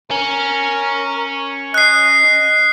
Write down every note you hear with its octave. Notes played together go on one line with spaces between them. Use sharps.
C#4 A#4
D#5 F#6 C7